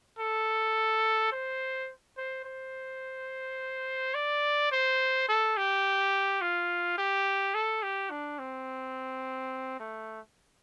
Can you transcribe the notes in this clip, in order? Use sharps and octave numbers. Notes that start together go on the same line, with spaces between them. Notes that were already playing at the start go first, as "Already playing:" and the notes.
A4
C5
C5
C5
D5
C5
A4
G4
F4
G4
A4
G4
D4
C4
A3